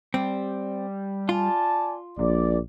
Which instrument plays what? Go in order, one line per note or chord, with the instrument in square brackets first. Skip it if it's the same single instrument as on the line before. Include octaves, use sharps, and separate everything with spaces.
[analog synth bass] G3 [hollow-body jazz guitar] C4
[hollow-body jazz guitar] F4 [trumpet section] D5 G#5 A5
[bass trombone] A#1 [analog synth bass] A#2 [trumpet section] D5